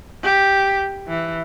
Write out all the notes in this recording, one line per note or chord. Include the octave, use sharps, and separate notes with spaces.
G4
E3